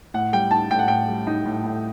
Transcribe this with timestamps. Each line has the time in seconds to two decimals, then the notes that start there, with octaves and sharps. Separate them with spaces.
0.14 A2 F#5
0.33 G3 G5
0.51 D#4 A5
0.70 A2 G5
0.79 F#5
0.88 A2 G5
1.08 G3
1.27 D#4
1.45 A2
1.64 A2